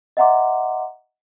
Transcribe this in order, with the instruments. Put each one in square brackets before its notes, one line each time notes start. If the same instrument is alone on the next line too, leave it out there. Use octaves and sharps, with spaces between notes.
[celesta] D#5 E5 F#5 A#5 C6 D6